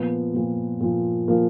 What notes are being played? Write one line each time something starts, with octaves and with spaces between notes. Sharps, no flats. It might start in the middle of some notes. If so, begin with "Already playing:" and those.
Already playing: A#2 F3 B3
A#2 F3
A#2 F3
A#2 F3 A#3